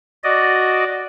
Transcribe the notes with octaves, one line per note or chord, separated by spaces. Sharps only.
F#4 D5 D#5